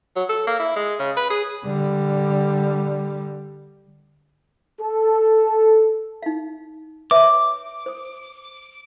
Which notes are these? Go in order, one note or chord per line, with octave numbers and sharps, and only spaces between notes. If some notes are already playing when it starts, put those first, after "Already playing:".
F#3
A4
A#3
E4
G#3
C#3
B4
G#4
D3 G3
A4
D#4 F5
B4 C#5 E5 D6
C5 D#6